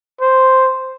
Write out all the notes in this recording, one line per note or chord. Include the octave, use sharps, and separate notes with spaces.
C5